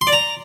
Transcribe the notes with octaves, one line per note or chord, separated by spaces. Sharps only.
C6
D5
A#5